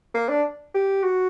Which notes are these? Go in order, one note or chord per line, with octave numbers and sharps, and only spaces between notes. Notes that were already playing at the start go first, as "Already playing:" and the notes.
A#3
D4
G4
F#4